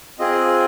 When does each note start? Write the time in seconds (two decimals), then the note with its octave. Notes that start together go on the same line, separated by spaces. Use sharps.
0.19 C4 F4 G#4 D#5